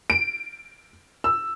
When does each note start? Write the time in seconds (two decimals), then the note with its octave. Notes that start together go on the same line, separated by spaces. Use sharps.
0.10 D7
1.24 E6